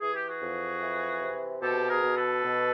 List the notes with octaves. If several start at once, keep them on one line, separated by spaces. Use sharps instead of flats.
E3 G#4
G4
F#4 G#4
F2
E3
C3
B2 G4 A4
G#4 A#4
B2
A4 B4
B2